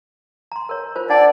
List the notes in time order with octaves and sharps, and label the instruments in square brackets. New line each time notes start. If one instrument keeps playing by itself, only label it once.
[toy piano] A#5 C6
A#4 C#5
F4 A#4 C5
[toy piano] D4 F#5 A5 [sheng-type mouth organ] D5